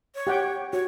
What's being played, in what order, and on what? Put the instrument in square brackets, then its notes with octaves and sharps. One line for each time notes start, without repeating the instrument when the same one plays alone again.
[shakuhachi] C#5
[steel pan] G4 F#5 G5
[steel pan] F#4 [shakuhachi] C#5